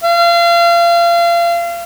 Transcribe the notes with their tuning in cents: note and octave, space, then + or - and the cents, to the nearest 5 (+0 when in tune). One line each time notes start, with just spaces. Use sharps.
F5 -35